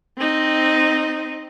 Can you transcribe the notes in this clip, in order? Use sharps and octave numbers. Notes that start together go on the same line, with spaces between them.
C4 D#4